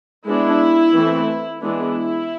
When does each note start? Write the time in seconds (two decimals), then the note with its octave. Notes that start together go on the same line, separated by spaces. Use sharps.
0.27 G#3 B3 D4 E4
0.94 E3 A3 C4
1.60 E3 G#3 B3 D4 E4